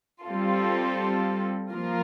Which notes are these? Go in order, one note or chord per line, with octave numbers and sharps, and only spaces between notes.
G3 C4 F4 A4
F3 A#3 F4 A#4